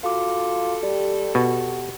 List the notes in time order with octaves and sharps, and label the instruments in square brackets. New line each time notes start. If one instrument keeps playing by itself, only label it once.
[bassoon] F4 [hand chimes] F#4 D6 [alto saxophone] A4
[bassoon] G3 [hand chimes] G4
[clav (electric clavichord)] B2 [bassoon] F#4